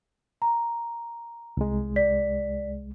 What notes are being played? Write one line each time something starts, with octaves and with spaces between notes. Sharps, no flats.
A#5
C2 G#3
D5 B6